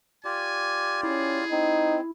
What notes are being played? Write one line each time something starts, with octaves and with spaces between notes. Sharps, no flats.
F4 G4 D5 G#5
C#4 E4 G#4
C4 D#4